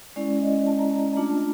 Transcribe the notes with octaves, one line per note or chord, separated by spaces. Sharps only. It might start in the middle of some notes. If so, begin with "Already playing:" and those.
G#3 C#4 E4 D5
D#5
A5
A#5
A#5
A#5
A3 D4 F4 A5